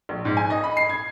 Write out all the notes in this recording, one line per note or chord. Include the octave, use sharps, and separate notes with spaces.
A#1
G#2
G#5
D#5
B5
C7
G#6